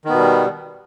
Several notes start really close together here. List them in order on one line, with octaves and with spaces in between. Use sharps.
D#3 B3 B2 G3